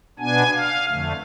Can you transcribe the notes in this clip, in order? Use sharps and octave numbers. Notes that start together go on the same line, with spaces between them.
B2 B3 D4 G#5
F5
F2 D3 A3